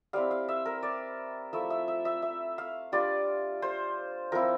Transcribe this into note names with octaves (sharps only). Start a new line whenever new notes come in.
G3 C4 E4 F5
F5
E5
A#4
D5
F3 A3 E4 E5
E5
E5
E5
E5
F5
G3 D4 F4 D5
C5
F3 C4 E4 A#4